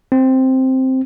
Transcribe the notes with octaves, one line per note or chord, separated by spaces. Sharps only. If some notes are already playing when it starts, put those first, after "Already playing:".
C4